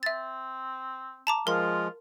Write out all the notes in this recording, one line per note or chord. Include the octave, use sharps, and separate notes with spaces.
C4 E5 A6
A5 A#5 D6
F3 G#3 F4 A#4 C6